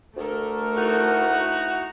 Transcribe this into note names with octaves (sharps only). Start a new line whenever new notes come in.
D2 A3 A4 A#4
D#4 E4 F#4